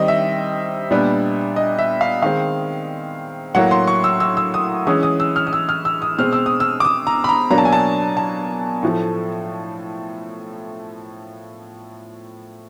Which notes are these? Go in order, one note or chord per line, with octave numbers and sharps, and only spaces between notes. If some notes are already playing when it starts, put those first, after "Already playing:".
Already playing: D#3 G3 C4 D#5
E5
A#2 G3 B3 D4
D#5
E5
F5
D#3 G#3 C4 F5
A2 F#3 A#3 F#5
C6
C#6
E6
E6
E6
D#6
E3 G#3 C#4 D#6
D#6
E6
F6
D#6
E6
F6
E6
D#6
B2 G#3 C4 F6
E6
D#6
E6
D6
D#6
A#5
B5
A#5
B2 F#3 A#3 D4 A#5
A5
G#5
A5
A5
A2 F3 A3